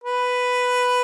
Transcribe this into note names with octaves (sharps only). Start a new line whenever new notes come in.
B4